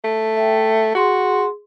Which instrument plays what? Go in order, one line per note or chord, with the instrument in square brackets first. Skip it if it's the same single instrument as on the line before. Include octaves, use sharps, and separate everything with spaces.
[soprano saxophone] A3
[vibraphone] E5 G5
[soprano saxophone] F#4 [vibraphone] G#4 C6